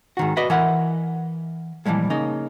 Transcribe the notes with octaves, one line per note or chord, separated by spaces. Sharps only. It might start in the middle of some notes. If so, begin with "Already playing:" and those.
G#2 D#3 F#4
F#4 B4 D5 D#5
E3 A#4 F#5 B5
A#2 E3 F3 G3 G#3
C#3 A#3 D#4